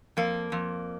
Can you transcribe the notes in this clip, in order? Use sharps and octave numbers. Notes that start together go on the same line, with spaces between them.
F2 A#3
F2